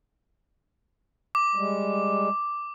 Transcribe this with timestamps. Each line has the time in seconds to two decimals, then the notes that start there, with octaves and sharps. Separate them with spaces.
1.35 D6
1.55 G3 G#3